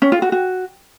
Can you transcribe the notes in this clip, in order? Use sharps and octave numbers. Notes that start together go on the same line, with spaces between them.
C#4
F4
F#4
F#4